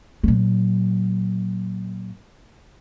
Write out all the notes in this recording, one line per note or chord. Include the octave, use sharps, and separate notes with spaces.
A#2 F#3